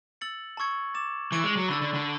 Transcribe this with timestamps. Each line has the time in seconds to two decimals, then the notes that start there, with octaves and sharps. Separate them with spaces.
0.21 E6 A6 C#7 F#7
0.57 A5 C#6 E6 G#6 C#7
0.94 D6 A6 E7
1.32 E3 C#6 G#6 D7 F#7
1.44 G#3
1.57 F#3
1.68 D3 B5 E6 A6
1.81 D3
1.94 D3